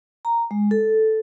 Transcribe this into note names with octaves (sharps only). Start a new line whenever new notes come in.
A#5
G#3
A4